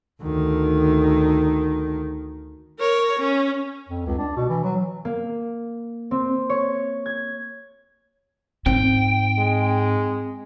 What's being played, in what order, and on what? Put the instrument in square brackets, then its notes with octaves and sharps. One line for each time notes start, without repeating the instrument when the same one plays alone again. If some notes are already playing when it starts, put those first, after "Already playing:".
[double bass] D2 D#3
[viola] A#4 C#5
C#4
[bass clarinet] F2
C#2
D4
B2
E3
F#3
[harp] A#3
C4
C#5
G#6
[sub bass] G#2 [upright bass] C4 [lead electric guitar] G5
[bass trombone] G#3